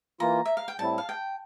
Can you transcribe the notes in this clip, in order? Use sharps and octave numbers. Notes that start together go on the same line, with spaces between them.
E3 A#3 F4 A#5
E5
F5
G5
A2 G3 C4 E4 A5
F5
G5